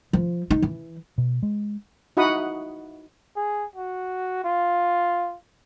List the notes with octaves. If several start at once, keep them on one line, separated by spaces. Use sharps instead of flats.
F3
D#4
E3
B2
G#3
D#4 E4 F#4 F#5 B5 D#6
G#4
F#4
F4